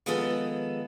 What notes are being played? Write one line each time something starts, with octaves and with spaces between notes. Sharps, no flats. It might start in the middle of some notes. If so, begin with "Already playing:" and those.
D#3 F3 G#3 B3 G#4 A4